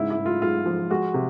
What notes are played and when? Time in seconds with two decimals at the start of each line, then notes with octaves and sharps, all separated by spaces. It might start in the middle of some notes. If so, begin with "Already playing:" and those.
Already playing: G#2 C#3 E4
0.10 E4
0.18 G#2
0.26 F4
0.42 G#2 F4
0.66 F3
0.90 G#3 F#4
1.14 C3